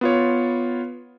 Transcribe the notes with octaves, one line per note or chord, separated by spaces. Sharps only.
B3 F4 C#5